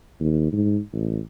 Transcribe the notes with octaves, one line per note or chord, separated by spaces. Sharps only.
D#2
G#2
A1